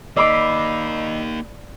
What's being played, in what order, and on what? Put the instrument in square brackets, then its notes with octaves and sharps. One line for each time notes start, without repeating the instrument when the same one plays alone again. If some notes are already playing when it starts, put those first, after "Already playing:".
[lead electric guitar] A#3 D#4 [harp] D5 B5 D6 [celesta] D#5 E6 C7